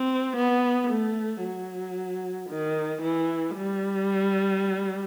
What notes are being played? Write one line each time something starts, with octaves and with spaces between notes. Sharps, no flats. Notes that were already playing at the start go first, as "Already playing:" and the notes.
Already playing: C4
B3
A3
F#3
D#3
E3
G3